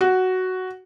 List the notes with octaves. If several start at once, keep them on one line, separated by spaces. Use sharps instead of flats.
F#4